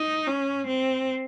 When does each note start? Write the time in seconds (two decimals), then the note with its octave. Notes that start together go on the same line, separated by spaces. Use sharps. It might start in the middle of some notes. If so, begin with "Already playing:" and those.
Already playing: D#4
0.27 C#4
0.67 C4